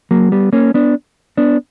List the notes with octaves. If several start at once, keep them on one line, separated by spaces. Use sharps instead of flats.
F#3 A#3
G3 B3
A#3 C#4
B3 D4
B3 D4